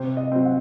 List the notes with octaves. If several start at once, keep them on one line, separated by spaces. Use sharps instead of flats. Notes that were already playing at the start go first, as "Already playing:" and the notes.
Already playing: C3 C5
D#5
F#3 C4
F#5